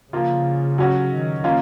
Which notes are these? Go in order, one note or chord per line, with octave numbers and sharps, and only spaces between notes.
C#3 F3 A#3 F4
F#3 C#4 F#4
D#3
A#3 C#4 F4